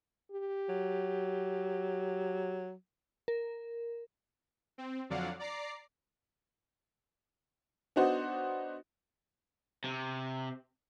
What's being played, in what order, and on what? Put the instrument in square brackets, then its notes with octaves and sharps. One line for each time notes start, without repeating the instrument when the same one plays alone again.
[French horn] G4
[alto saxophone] F#3
[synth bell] A#4
[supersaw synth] C4
F2 D3 F#3 D5 F5 F#5
D5 A#5 D6 C7
[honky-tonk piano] B3 D4 D#4 F#4 C5
[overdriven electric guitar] C3